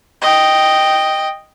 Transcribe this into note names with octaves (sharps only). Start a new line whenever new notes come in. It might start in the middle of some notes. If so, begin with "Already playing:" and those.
D#5 G5